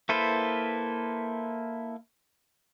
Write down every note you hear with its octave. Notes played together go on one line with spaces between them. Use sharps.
A#3 E4 A4 B4 C5